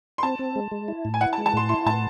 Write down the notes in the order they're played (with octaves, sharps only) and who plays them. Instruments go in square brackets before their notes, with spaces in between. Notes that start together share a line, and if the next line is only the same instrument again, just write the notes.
[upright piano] C6
[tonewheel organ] C4 [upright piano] A5
[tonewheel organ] C4
G#3
G#3
E4
A2
[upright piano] G#5
[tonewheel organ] E4 [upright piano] F#5
[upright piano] A5
[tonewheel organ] G#3
[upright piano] A5
[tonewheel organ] A2 [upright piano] C6
[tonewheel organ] E4 [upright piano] C6
[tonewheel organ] A2 [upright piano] A5